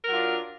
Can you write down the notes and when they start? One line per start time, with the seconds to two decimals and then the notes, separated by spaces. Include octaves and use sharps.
0.05 A#4
0.08 F#3
0.12 F4
0.15 D4